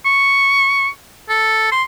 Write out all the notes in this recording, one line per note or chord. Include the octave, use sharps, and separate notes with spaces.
C#6
A4
C6